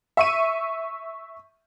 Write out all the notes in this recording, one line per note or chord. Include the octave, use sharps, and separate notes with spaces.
E5 C#6 D#7